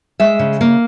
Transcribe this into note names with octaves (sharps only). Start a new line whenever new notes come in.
G#3 E5
C#3
A#3